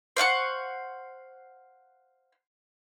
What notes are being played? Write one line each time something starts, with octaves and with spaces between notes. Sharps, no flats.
C5 F5 F#5 C#6